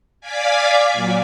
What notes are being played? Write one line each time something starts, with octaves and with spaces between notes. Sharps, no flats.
D5 F5 G#5 D6 G#6 B6
A#2 F#3